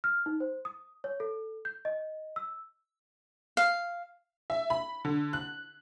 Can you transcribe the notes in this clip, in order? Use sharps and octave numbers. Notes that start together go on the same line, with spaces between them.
F6
D#4
C5
D#6
C#5
A4
G6
D#5
E6
F5
E5
B5
D3
F#6